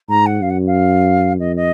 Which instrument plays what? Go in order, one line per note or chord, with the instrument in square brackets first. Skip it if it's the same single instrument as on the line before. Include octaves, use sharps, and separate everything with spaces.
[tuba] G#2 [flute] A#5
[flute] F#5
[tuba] F#2 [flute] F5
[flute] F#5
F5
[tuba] F2 [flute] D#5
[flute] D#5